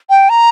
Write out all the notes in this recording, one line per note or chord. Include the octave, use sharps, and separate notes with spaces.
G5
A#5